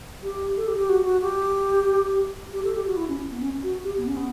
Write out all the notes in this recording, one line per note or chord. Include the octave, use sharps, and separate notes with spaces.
G4
A4
G4
G4
F#4
F#4
G4
G4
A4
G4
F#4
E4
C#4
B3
C#4
F#4
G4
B3
C#4
B3